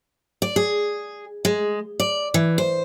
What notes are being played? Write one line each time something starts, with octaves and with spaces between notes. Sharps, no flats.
D5
G#4
G#3
D5
E3
C5